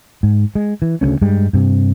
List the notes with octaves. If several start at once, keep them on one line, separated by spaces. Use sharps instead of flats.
G#2
G#3
E3
D2 C#3 A#3 C#4
G2 G3 G#3
G2 C3